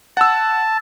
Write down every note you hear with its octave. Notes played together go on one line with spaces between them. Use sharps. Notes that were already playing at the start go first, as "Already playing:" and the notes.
F#5 A5 E6